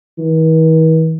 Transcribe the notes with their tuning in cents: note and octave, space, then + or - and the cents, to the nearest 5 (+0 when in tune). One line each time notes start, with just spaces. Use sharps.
E3 -45